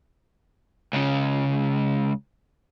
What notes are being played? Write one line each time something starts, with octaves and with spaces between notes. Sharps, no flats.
C#2 C#3